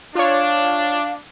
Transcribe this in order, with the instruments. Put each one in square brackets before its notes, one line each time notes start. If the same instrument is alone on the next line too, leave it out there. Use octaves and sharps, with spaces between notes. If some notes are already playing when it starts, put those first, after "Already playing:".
[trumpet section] D4 [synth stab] F4 C#5 [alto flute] F5